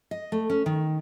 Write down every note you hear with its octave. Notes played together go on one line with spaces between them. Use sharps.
D#5
A3
C#4
D#3